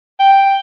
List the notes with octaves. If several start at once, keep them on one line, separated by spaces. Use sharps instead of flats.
G5